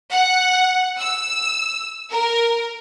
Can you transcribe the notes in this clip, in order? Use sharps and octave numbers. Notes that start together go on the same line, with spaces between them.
F#5
E6
A#4